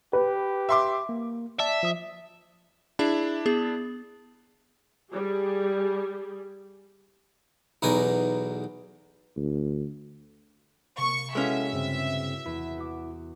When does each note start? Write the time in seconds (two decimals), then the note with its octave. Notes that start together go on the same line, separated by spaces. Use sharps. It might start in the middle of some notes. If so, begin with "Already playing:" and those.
0.13 G4 B4
0.69 E5 C6 D6
1.09 A#3
1.59 D5 E5 A5 E6
1.83 F3 D#6
2.99 D4 E4 G#4 E5
3.46 B3 G#4
5.11 G3 G#4
7.82 B1 E2 B2 D#4 G#5
9.37 D2
10.97 C3 A#3 C#6
11.35 G#3 C#4 E4 F#4 A4 B4 E5 F5
11.73 G2 C#3 C4
12.46 E2 E4
12.78 F#4 D6